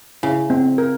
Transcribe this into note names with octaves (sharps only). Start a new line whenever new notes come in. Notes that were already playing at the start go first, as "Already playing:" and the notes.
C#3 E4
C4
A#4